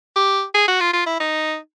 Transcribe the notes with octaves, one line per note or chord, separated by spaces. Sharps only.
G4
G#4
F#4
F4
F4
E4
D#4